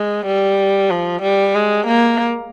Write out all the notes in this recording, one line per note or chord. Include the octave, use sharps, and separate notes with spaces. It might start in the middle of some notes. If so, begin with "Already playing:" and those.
Already playing: G#3
G3
F3
G3
G#3
A#3